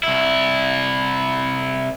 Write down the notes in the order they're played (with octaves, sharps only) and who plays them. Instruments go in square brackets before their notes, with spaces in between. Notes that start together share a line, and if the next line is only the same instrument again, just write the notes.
[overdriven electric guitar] C2 E4